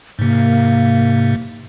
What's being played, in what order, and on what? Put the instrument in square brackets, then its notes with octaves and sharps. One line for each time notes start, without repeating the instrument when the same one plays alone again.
[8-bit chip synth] G#2 C3 [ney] A#3